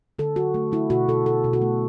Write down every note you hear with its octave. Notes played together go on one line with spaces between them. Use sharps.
D3 A4
D3 F#4
A3
A3 E4
B2 F#4
B2 A4
B2 A4
B2
F#4
A3